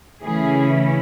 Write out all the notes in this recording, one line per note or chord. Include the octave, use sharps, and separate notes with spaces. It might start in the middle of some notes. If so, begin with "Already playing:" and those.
C#3 E3 A3 C#4 E4 G#4